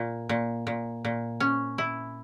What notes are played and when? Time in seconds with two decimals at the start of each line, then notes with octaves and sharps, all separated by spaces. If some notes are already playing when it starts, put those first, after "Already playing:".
Already playing: A#2
0.29 A#2
0.67 A#2
1.05 A#2
1.40 C#4
1.78 E4